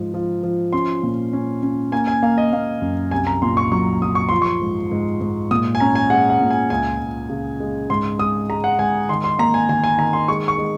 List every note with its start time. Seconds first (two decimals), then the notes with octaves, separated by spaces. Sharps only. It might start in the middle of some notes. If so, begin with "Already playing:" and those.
Already playing: G#2 F3
0.14 F3
0.43 F3
0.73 C#4 C6
1.03 A#2
1.33 C#4
1.63 C#4
1.92 A#3 G#5
2.07 G#5
2.23 A#3 F5
2.38 D#5
2.53 A#3 F5
2.82 F#2
3.11 C2 G#5
3.27 A#5
3.42 A#2 C6
3.57 C#6
3.72 F#3 C#6
4.02 F#3 D#6
4.15 C#6
4.29 F3 C6
4.42 C#6
4.61 G#2
4.91 G#2
5.21 G#2
5.51 A#2 D#6
5.75 G#5
5.80 C#4 A#5
5.95 G#5
6.10 G#3 F#5
6.30 F#5
6.40 A#2
6.50 G#5
6.70 C#2 G#5
7.01 C#2
7.29 C#3
7.60 G#3
7.90 G#2 C6
8.19 G#3 D#6
8.50 G#3 A#5
8.64 F#5
8.79 G#2 G#5
9.09 D#3 C6
9.24 C6
9.39 A#3 A#5
9.54 G#5
9.69 D#3 G#5
9.84 G#5
9.98 D#3 A#5
10.13 C6
10.28 G#3 C#6
10.48 C#6
10.58 G#3